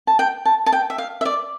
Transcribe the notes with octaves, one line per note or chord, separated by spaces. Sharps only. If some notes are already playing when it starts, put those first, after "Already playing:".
A5
G5
A5
A5
G5
E5
F5
E5
D5